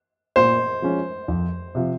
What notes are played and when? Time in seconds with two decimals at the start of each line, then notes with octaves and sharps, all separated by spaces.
0.36 A#2 C5
0.82 F3 G#3 C#4
1.28 F2
1.75 C3 F3